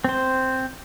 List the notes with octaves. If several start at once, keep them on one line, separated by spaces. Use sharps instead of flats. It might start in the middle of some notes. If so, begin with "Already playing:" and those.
C4 C5